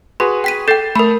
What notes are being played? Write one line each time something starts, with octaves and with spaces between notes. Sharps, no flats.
F#4 G#4 B4 C6
G5 B6 D#7
A4 G5 G6 A6 C7
A3 A#4 B5